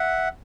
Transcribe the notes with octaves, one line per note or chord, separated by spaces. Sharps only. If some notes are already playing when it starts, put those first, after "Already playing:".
Already playing: E5 F#5